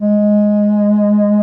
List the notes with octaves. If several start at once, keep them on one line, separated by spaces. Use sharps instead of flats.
G#3